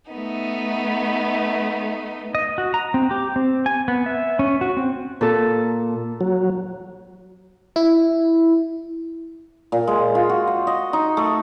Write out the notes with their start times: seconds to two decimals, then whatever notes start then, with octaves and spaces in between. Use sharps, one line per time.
0.11 A3 B3 D#4
2.35 D#5
2.58 F#4
2.74 A#5
2.94 C4
3.11 G4
3.36 C4
3.66 G#5
3.88 B3
4.06 E5
4.39 C#4
4.61 F#4
4.77 C4
5.21 A#2 A4
6.21 F#3
7.76 E4
9.72 A#2
9.87 G#3
10.15 F4
10.29 F#4
10.47 C5
10.67 D#5
10.93 D#4
11.17 A3